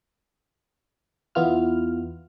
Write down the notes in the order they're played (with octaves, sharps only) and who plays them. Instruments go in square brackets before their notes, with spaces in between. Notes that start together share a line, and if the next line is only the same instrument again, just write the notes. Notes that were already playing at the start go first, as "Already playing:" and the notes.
[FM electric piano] E2 B3 E4 F4 F6